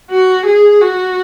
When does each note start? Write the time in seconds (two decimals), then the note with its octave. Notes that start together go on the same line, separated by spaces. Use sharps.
0.11 F#4
0.46 G#4
0.82 F#4